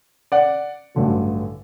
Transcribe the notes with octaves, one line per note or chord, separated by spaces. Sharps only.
D5 F#5
A1 G2 D3 F#3